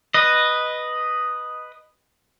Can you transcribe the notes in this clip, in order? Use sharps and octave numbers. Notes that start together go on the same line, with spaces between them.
B4 D#5